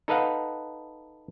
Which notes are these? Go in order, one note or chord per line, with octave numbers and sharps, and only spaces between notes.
D#4 A4 B4 D#5 F5 F#5